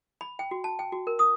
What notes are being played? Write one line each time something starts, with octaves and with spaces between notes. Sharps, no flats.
B5
G5
F#4
A5
G5
F#4
A#4
D#6